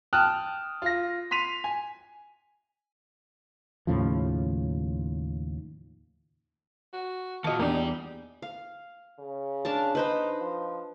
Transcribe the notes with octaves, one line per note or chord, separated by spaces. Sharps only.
G5 A5 D#6 F6 F#6
F4 A#6
C6 B6 D#7 F7
G#5
D#2 A2 C#3 F3
F#4
A#2 D#3 A#3 F#4 D#5 A5 D#6 C#7
E2 A#3 D4 D#4 G4 D5
F5
C#3
D4 A#4 A5
D#4 B4 C5 B5
F3